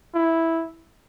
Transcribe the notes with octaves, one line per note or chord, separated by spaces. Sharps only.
E4